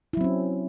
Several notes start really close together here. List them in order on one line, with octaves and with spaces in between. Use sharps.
E4 F#3 C4 C#4